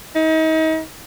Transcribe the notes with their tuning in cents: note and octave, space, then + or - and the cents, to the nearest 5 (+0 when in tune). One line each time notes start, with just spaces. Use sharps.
D#4 +35